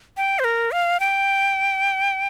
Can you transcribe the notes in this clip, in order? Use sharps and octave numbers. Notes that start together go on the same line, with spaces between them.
G5
C5
A#4
F5
G5